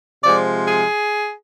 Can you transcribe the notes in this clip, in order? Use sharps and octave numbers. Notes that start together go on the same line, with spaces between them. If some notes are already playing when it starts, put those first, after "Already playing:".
C3 F3 G#3 D5
G#4